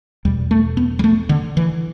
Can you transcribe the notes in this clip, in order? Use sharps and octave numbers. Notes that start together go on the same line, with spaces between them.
E2 B2 G3
A3
B3
G3
A3
D3
E3